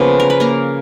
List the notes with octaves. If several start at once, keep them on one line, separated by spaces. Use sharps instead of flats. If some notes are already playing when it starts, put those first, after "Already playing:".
Already playing: C#3 F3 A#3 B3 B4
A#4
B4
A#3 A#4